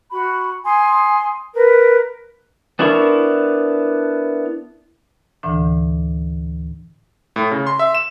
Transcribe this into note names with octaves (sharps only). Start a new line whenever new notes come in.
F#4 B5
G#5 C6 D#6
A#4 B4
B3 D4 E4 A#4 C#6
D2 A2 D3 E3 D4
A2
C#3
C6
E5
E7